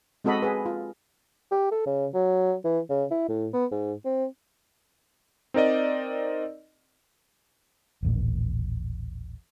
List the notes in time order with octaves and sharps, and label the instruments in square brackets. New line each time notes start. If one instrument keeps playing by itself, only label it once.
[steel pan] G#3 C4 F#4 A4 D#5 B5
G#4 B4
F4
[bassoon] G4
A4
C#3
F#3
E3
C#3
E4
A2
B3
G#2
C4
[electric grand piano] C4 D#4 A#4 D5 D#5
[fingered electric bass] D#1 A1 A#2